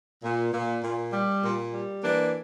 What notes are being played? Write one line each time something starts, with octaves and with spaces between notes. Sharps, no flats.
A#2
A#2
A#2
G3
A#2
G3
E3 A#3 D4